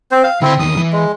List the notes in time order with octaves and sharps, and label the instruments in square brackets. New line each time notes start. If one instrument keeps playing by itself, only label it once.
[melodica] C4 C5
F5
[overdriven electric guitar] D3 C6 [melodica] C4 E4
[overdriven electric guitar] E2 D#3 [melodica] D#6
[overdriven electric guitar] E3
[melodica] G#3